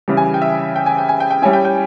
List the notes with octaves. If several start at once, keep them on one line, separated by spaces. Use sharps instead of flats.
C#3 E3 G3
G#5
G5
E5
G5
G#5
G5
G#5
G5
G5
G3 C#4 E4 G#5
G5
G5